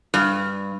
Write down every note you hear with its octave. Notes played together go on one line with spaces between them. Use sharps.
G2